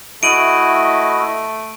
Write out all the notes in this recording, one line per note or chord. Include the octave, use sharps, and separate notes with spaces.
A3 E4 F#4 D#5 D7 D#7 F#7